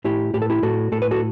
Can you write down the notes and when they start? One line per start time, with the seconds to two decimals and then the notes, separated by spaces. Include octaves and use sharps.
0.04 A2 E4 G4
0.34 A2 G4
0.42 A4
0.50 E4 G4
0.63 A2 F#4 A4
0.92 A2 A4
1.02 B4
1.11 F#4 A4